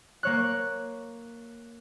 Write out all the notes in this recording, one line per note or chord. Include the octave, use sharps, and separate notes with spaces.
A#3 C#5 F#6